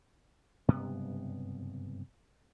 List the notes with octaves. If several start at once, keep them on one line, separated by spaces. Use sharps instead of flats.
F#1 G2 C3 B3